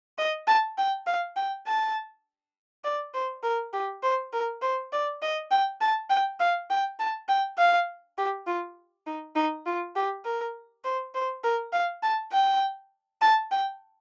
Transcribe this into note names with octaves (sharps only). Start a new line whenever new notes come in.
D#5
A5
G5
F5
G5
A5
D5
C5
A#4
G4
C5
A#4
C5
D5
D#5
G5
A5
G5
F5
G5
A5
G5
F5
G4
F4
D#4
D#4
F4
G4
A#4
C5
C5
A#4
F5
A5
G5
A5
G5